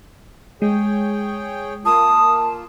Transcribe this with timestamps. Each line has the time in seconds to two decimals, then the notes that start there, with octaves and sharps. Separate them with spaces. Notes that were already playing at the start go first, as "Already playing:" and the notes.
0.62 G#3 G#4 C#5 G5
1.85 A#3 F4 A5 D#6